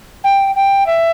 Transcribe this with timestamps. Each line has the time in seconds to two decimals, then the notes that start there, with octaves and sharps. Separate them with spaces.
0.24 G5
0.55 G5
0.86 E5